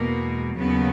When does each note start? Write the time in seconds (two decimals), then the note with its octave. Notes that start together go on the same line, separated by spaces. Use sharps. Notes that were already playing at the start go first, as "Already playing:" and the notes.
Already playing: E2 B2 G#3 A#3
0.57 D#2 C#3 F#3 B3